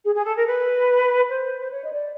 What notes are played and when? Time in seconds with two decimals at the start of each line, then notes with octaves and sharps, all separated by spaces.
0.04 G#4
0.15 G#4
0.25 A4
0.35 A#4
0.46 B4
1.29 C5
1.60 C5
1.71 C#5
1.84 D#5
1.91 D5